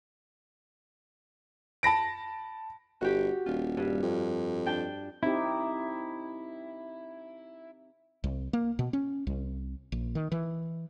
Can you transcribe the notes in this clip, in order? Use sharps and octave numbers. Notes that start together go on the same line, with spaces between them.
A5 B5 A#6 D7
G1 F#4 G4
D#1 F4
G2
F2
D4 G5 A5
C4 D#4 E4 G4
C2
A#3
B2
C#4
C2
A#1
D#3
E3